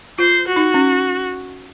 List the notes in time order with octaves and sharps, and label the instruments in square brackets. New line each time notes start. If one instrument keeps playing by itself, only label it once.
[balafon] F4 [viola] C5
[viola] F#4
[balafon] D#4
C#4